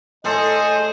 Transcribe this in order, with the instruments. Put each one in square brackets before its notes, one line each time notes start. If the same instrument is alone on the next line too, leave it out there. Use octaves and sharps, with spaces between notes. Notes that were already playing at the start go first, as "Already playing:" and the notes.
[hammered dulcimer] A2 A4 [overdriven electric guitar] G#4 [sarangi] C5 [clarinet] D#5